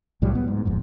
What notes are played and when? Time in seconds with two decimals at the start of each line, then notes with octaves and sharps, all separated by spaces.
0.22 C2 A2 F#3 G3
0.35 B3
0.48 G#2
0.65 D1 F2 G#2